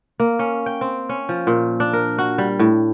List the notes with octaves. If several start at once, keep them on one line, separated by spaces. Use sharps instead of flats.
A#3
C#4
G5
C4
C#4
F3
A#2
D4
A#4
F#4
G3
A2